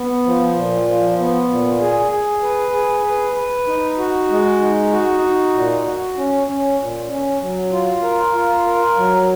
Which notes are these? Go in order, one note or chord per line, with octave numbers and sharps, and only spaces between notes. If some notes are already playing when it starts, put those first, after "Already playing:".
Already playing: B3
F3
A#2
F3
B3
A#2
G#4
G#4
B4
G#4
B4
B4
D#4
F#4
G#3
D#4
F#4
D#4
A#2
F#4
C#4
C#4
A#2
C#4
F#3
F4
A#4
F4
A#4
F#3